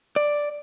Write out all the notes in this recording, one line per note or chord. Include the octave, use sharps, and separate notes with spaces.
D5